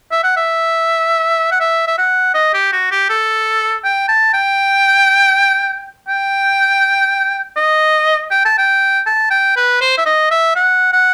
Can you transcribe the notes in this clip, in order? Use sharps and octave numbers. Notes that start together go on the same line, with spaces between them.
E5
F#5
E5
F#5
E5
E5
F#5
D#5
G4
F#4
G4
A4
G5
A5
G5
G5
D#5
G5
A5
G5
A5
G5
B4
C5
E5
D#5
E5
F#5
F#5